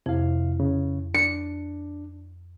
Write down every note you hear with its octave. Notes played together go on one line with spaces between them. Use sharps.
F2 C3 E4 F5
C#3
D4 C#7